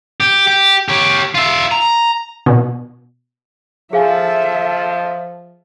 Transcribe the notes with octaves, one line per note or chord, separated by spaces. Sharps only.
G4
G4
G4 C#5
F4 E5
A#5
B2
F3 G#4 A4 E5 F5 G#5